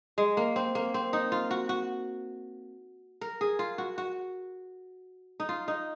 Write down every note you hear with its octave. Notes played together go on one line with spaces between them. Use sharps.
G#3
A#3
C4
A#3
C4
D#4
F4
F#4
F#4
A#4
G#4
F4
F#4
F#4
D#4
F4
D#4